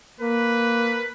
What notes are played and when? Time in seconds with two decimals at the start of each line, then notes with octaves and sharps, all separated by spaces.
0.20 A#3 A#4 B4